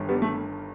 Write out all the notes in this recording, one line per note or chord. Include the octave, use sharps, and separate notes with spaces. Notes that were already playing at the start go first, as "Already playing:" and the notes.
Already playing: G1 G2 D#3
G3 B3
A3